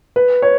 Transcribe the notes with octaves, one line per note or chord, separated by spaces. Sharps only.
B4
C#5